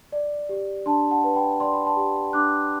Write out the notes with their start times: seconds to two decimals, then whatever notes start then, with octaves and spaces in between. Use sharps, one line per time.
0.12 D5
0.49 G4
0.86 D4 A5 C6
1.11 F#5 A5
1.24 B4
1.35 G5 B5
1.60 D5 C6
1.74 B5
1.86 A5 C6
1.97 G4
2.33 D4 D6 F#6